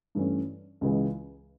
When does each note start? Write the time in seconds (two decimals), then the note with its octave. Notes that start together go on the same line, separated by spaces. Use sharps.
0.15 G2 E3 A3 C#4
0.81 C#2 C#3 E3 G#3